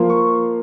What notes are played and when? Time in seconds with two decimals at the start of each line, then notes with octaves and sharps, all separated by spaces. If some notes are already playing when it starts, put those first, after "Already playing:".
Already playing: F3 A#3 F4
0.10 C#6